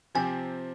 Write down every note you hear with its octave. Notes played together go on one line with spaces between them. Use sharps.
C3 F3 C4 G4 G#5